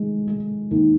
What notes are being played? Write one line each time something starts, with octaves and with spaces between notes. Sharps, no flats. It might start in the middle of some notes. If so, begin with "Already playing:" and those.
Already playing: D#3 G#3
G#3
D#2